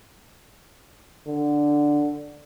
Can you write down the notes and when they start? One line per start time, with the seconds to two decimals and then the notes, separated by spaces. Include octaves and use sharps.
1.27 D3